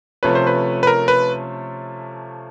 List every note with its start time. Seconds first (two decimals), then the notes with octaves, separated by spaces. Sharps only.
0.23 C3 F3 A3 C#4 B4
0.35 C5
0.47 B4
0.83 B4
0.87 A#4
1.08 B4